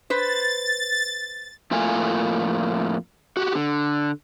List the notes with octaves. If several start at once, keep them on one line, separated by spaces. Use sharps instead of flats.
B4 C5 A6
F2 A2 A3 A#3 F4 G#5
F#4 G4
D3